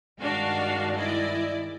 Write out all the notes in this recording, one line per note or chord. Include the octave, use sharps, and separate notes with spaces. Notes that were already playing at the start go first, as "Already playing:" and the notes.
G2 D#3 G#3 D4 F#4 F5
E4 D5 D#5